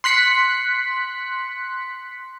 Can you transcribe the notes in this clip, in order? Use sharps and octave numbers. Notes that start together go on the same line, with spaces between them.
C6 F#6 B6 C#7